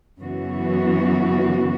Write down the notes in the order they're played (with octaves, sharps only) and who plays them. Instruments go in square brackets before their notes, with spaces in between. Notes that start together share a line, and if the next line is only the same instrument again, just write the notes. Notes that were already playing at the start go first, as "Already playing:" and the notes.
[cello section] F#2 C#3 E3 B3 F#4